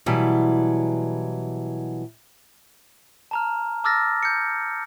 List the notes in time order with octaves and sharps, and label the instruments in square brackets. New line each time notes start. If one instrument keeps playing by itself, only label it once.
[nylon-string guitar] B2 E3 F#3 G3
[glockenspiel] A5 A#5 F6
A5 D6 E6 F6 A6 A#6
G6 C#7